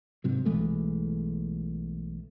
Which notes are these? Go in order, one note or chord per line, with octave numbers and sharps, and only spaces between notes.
G#2 C3 F#3
B1 E3 G#3 A3